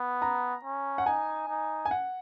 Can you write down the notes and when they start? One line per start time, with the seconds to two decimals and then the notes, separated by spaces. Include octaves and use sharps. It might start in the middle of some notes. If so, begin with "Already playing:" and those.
Already playing: B3
0.22 A#5
0.64 C#4
0.98 F#5
1.06 D#4 G#5
1.49 D#4
1.85 G#5
1.91 F#5